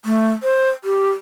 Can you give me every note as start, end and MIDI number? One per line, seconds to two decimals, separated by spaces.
0.05 0.29 57
0.43 0.69 72
0.84 1.10 67